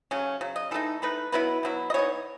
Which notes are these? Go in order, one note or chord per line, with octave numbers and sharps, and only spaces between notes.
C#3 F#3 A3 C#4
C#3 F#3
D#5
E3 A3 D#4 A4
E3 A3 D#4 B4
B2 F#3 B3 E4 B4
B2 F#3 B3 E4
D#5
E3 B3 D#4 C#5